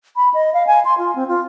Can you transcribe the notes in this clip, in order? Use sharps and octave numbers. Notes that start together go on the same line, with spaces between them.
B5
D#5
F5
G#5
C6
F4
C4
F4